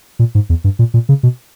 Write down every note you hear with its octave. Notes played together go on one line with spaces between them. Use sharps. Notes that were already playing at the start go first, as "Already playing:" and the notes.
A#2
G#2
E2
G2
A#2
A#2
C#3
B2